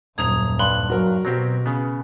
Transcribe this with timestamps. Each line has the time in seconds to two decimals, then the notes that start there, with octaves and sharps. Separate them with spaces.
0.18 D#1 F#2 A#5 D#6 G#6 F7
0.59 G2 B5 C6 F#6
0.90 F#3 F#4 A#4
1.25 B2 F#3 C4 G4 A#6
1.66 C#3 B3